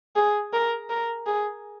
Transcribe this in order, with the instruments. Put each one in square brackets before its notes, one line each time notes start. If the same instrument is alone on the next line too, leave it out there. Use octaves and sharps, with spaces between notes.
[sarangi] G#4
A#4
A#4
G#4